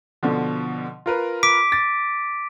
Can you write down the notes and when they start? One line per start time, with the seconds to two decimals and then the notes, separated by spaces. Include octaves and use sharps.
0.23 B2 D3 F3
1.06 F4 A#4 B4
1.43 D6 B6 D7
1.72 A6